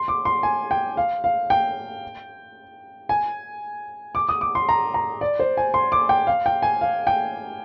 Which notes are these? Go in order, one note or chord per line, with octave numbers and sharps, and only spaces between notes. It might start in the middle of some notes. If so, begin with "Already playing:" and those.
Already playing: C6
D6
C6
G#5
G5
F5
F5
G5
G#5
D6
D#6
D6
C6
A#5
A#5
D5
C5
G#5
C6
D6
G5
F5
G5
G#5
F5
G5